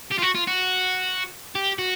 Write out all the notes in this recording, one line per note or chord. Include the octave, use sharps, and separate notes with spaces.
G4
F4
F#4
F4
F#4
G4
F#4